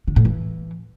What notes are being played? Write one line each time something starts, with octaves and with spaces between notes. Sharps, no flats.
D3
A2
E3